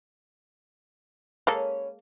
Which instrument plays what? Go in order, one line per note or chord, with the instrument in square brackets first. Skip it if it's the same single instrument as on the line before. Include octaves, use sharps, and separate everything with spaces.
[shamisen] G#3 A#3 A4 [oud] C#4 B4 C#5